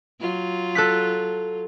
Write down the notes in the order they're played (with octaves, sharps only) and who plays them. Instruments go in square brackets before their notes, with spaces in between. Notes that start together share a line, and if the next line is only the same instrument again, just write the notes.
[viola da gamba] F#3 F4
[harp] A4 F#6 B6